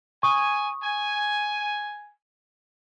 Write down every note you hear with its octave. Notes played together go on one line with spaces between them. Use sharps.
G#5 C#6 D#6
G#5